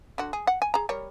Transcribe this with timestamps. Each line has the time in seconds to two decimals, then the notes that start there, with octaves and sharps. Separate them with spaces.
0.18 D3 F#4
0.33 G#4
0.47 F#5
0.62 G#5
0.74 G#4 A#5
0.89 G3 A#4 C#5